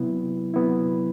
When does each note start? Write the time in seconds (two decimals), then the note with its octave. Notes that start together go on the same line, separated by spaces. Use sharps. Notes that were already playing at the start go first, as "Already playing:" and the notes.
Already playing: C3 F#3 B3 E4
0.54 C3 F#3 B3 E4